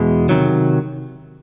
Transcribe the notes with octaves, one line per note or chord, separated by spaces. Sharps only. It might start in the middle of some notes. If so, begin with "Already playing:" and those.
Already playing: E2 B2 G#3
C3 D#3 F#3